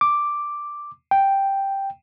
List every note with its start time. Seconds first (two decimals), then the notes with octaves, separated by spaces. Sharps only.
0.01 D6
1.11 G5